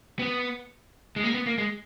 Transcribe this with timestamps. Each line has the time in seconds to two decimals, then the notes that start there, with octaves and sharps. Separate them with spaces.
0.19 B3
1.16 G#3
1.24 A#3
1.34 B3
1.46 A#3
1.58 G#3